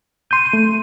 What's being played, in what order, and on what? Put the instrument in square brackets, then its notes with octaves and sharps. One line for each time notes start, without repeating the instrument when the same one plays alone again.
[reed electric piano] C6 G6 [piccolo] D#7
[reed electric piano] A3